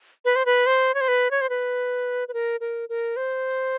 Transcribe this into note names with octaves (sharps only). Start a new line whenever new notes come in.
B4
C5
B4
C5
C#5
C5
B4
C#5
C5
B4
B4
A#4
A#4
A#4
C5